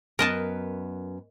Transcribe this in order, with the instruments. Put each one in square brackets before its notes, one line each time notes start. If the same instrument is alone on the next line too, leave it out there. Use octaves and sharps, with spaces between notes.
[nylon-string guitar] F#2 B3 B4 [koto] A#4 D#5 A5